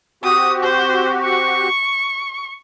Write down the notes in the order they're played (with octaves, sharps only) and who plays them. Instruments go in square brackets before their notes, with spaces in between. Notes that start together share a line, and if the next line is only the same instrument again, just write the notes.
[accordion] C4 F#4 G4 [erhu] D#6
[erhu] C5
C#6